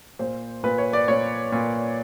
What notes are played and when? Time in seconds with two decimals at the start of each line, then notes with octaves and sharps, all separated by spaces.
0.19 A#2 C5
0.64 A#2 B4
0.78 C#5
0.93 D5
1.08 A#2 C#5
1.52 A#2